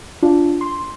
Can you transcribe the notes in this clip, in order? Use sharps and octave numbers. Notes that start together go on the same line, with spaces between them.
D4 F4
C6